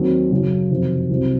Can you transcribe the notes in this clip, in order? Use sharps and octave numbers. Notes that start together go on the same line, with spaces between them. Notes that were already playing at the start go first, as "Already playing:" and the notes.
Already playing: D#2 D#3 F#3 C4
F#2 C#3 F#3
F2 C3 D#3 F#3
C2 C3 F#3